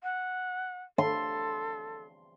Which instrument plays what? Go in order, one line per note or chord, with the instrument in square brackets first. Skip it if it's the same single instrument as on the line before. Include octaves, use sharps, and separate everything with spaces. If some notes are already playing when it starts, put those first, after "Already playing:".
[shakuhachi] F#5
[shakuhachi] A4 [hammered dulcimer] C6